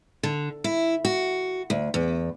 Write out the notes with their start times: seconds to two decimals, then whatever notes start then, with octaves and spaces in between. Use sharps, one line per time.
0.23 D3
0.64 E4
1.05 F#4
1.70 D2
1.94 E2